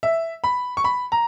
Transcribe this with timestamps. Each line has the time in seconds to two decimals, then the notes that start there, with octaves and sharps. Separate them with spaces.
0.03 E5
0.44 B5
0.77 C#6
0.84 B5
1.12 A#5